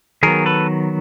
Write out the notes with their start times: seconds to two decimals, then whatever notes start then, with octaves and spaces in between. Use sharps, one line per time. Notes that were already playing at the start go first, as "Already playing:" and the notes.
0.23 D#3 F#3 B3 G#4 A#4
0.46 A4 B4